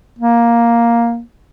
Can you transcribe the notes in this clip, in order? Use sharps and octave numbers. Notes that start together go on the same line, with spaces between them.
A#3